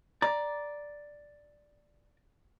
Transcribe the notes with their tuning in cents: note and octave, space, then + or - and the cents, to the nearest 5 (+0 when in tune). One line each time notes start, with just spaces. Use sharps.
D5 +0 A#5 +15